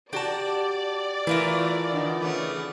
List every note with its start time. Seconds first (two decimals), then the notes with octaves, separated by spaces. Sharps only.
0.13 F#4 G4 D5 A5
1.27 E3 A3 E4 F4 A#4
1.92 D3 D#3
2.21 C#3 A3 B3